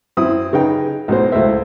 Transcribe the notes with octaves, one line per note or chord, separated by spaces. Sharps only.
F#2 C4 E4 D#6
C#3 D#4 B4 G5
B1 A2 F#3 C5
C#2 A3 E4 C5 E5